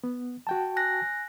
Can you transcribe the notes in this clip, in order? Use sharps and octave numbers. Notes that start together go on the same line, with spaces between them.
B3
F#4 G5 A5
G#5 F#6 A#6